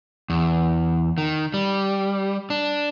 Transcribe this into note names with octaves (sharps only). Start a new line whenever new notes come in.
E2
D#3
G3
D4